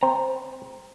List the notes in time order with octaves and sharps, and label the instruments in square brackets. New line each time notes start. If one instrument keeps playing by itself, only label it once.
[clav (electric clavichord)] C4 A#5